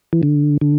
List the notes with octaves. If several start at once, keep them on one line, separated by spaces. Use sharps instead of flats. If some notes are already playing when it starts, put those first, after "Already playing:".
E3
D3
D3